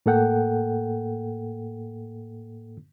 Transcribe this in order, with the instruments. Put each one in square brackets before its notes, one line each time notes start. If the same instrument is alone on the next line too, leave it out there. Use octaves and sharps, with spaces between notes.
[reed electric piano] A2 A#3 A4 F#5 G5